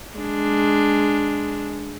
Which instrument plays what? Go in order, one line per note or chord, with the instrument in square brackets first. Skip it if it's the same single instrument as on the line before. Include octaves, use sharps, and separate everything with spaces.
[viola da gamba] G#3 D4